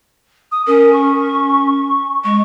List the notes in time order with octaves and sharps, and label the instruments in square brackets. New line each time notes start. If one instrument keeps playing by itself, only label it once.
[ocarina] D#6
[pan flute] C#4 [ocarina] A#4
[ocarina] C#6
[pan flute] G#3 [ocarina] C#6